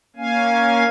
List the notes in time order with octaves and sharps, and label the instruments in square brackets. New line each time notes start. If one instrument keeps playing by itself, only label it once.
[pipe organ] A#3 C#4 F5 G#5